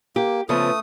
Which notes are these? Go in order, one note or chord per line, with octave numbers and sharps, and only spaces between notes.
A#3 G4
C#3 F3 A3 B3 D#6